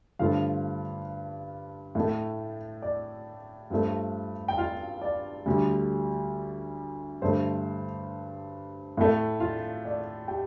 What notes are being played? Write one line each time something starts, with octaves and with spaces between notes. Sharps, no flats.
G2 D3 F3 A3 F4 F5
A2 A3
D5
G2 F3 A3
G5
F4 F5
D5
D2 D3 G3
G2 D3 A3 C5
A2 A3
F4 F5
D5
G4 G5